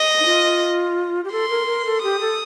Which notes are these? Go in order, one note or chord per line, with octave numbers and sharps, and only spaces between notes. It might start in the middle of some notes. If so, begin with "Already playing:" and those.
Already playing: D#5
D#4
F4
G4
A4 C6
A#4
A#4
A4
G4 D#6
A4